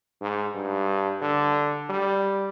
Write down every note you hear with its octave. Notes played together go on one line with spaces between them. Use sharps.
G#2
G2
D3
G3